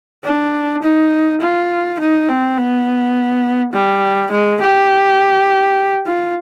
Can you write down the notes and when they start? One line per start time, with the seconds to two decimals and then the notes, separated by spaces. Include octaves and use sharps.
0.24 D4
0.83 D#4
1.41 F4
1.99 D#4
2.28 C4
2.57 B3
3.73 G3
4.31 G#3
4.61 G4
6.06 F4